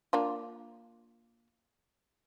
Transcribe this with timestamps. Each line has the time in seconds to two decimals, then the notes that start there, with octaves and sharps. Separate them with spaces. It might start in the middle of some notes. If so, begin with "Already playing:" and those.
0.13 A#3 D4 F4